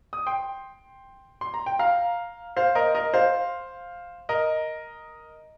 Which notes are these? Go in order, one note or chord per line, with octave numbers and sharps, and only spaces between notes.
D#6
G5 C6
C6
A#5
G5
F5 A#5
C5 F5
A#4 D#5
A#4 D#5
C5 F5
A#4 D#5